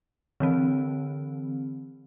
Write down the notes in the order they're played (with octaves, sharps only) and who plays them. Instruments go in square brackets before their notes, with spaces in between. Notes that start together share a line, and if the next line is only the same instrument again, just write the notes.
[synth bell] D3 E3 C4